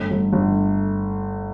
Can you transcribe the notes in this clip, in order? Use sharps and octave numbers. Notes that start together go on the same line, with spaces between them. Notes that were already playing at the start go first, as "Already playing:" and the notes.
Already playing: G1 A3
G1
G1